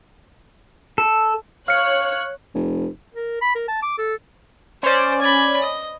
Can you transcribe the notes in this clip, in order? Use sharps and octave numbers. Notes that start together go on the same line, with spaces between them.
A4
C#5 F5 F6 F#6 C#7
F1
A#4
B5
A#4
A5
D6
A4
C#4 C5 D5
G#5 B5
D#5